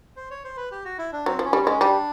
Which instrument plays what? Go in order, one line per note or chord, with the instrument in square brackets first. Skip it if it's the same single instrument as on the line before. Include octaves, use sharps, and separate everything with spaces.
[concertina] C5
C#5
C5
B4
G4
F#4
E4
D4
[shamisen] F#3 [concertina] C4
[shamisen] F3
[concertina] C#4
[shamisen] G3
[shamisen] G#3 [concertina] C#4
[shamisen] G3 [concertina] D4